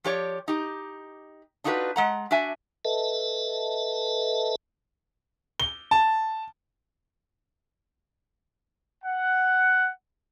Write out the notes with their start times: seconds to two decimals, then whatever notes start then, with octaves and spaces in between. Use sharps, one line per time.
0.04 F3 G4 C#5 D5
0.48 D#4 G4
1.64 D4 D#4 F4 F#4 G#4 B4
1.96 G#3 F#5 A#5
2.31 D4 F#4 E5 G#5
2.85 A4 B4 D#5 E5 A5
5.60 G7
5.91 A5
9.04 F#5